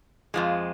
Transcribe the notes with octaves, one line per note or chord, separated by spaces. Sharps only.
F2 F3 G#3